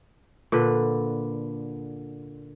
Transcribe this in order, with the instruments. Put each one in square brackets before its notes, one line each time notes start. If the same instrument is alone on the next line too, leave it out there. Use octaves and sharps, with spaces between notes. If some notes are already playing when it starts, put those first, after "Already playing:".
[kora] A#2 D3 B4